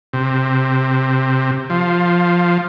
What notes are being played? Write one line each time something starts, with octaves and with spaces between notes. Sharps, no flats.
C3
F3